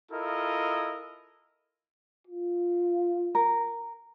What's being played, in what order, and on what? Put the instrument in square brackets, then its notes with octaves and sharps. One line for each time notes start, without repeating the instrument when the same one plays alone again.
[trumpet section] E4 F4 A4 A#4 D#5
[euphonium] F4
[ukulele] A#4